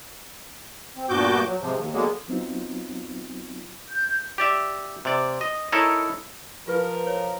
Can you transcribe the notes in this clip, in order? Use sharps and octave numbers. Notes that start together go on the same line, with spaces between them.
C4
G2 A#2 B3 F#4 D6 G6
F#3
G#2 C3 F3
D#2
D3 F#3 G#3 A#3 B3
F#3 B3 C4 D#4 F4
G6
G4 D5 E5
C3 D5
D#5
D#4 E4 A4 A#4 C#5
F3 F4 G4 A#4 B4
C#5